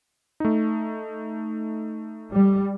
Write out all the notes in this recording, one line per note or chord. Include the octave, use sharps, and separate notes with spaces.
A3 D#4
G3